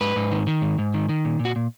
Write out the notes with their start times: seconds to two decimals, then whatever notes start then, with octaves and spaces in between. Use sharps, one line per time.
0.01 G#2 B4
0.16 G#2
0.31 D#3
0.47 D#3
0.62 G#2
0.78 G#2
0.94 D#3
1.09 D#3
1.25 A#2
1.39 A#2
1.45 F#4
1.56 A#2